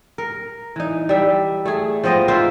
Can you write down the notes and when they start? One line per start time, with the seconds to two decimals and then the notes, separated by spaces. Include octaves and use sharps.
0.18 A#4
0.76 E3 D#4
1.09 G3 E5
1.65 A3 G#4
2.04 F3 B3 C4 D#5
2.28 A#3 F4 C5 E5